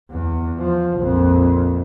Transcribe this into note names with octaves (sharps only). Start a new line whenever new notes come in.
E2
F3
A#1 F2